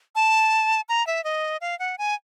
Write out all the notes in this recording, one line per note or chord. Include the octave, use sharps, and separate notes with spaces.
A5
A#5
E5
D#5
F5
F#5
G#5